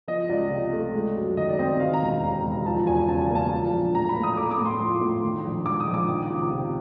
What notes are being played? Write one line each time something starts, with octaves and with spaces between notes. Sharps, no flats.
F3 D#5
C#2 D5
C3
A3
G#3
F#2
D#3 D#5
D5
C4 D#5
D#3 F5
A#5
E1
A#5
D#2
E1
F3 A5
E2 G#5
C#3 A5
G#5
A#3
A5
F3
A#1
A2 A#5
B5
A#3
D#6
A3 D6
D6
A2
C6
F3 C6
A2
D#3
A#1
G#2 D6
D#6
A#1
D6
D#3
C#2
C3